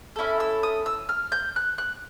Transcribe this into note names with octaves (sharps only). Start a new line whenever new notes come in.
C#4 E4 A4
E6
D#6
E6
F6
G6
F#6
F#6